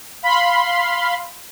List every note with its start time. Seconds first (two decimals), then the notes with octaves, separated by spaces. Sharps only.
0.23 F5 B5 C6